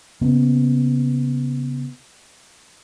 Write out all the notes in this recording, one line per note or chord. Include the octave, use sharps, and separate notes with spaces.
C#3 A#3 B3 C#4